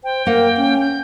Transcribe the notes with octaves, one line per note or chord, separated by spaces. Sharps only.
C5 G5
A#3 A#4 F#5
C#4
G6